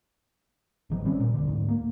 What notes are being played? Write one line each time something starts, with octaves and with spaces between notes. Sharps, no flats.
G#1 D#3 F#3
G3 C4 C#4
A#2
E1 A#1 D3
D2 G#2
A#3